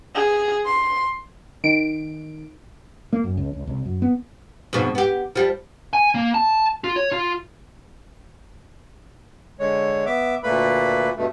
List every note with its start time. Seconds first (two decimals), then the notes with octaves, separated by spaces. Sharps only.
0.15 G#4
0.66 C6
1.64 D#3 D7
3.13 A#3
3.24 F#2
3.37 C#2
3.53 C#2
3.67 C2
3.85 F#2
4.02 B3
4.73 F2 G#2 B2
4.95 B3 G4
5.36 F3 G3
5.93 G#5
6.15 A#3
6.34 A5
6.84 F4
6.96 C#5
7.12 F4
9.59 D3 G#3 C#5
10.06 B3 E5 D6
10.43 D2 A#2 A3 A#3 B4 B5
11.17 G2 B2 A3